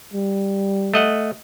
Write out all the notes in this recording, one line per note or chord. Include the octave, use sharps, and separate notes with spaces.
G3
A3 D#5 F#5